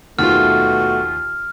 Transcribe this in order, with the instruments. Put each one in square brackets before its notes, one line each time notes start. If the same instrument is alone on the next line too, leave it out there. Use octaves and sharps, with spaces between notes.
[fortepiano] D#2 F4 [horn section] B2 A3 [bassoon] F#4 [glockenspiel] F6